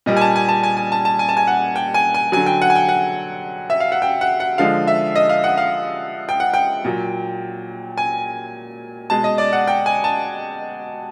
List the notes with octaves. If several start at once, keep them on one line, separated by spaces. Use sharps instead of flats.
A#2 G3 D#5
G#5
A5
G#5
A5
G#5
G#5
A5
A5
G#5
A5
G#5
F#5
G5
G#5
G#5
D3 F#3 G#5
G5
F#5
G#5
G5
F#5
E5
F5
F#5
G5
F#5
F#5
D3 F3 G#3 F5
E5
D#5
F5
F#5
F5
G5
F#5
G5
A#2 F#3
G#5
B2 G#3 A5
D#5
D5
F#5
G5
G#5
A5